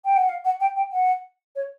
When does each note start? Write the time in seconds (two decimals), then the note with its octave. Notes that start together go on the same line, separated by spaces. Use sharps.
0.05 G5
0.17 F#5
0.29 F5
0.45 F#5
0.60 G5
0.76 G5
0.92 F#5
1.56 C#5